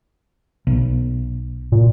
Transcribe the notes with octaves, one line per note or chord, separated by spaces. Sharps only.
B1
A#2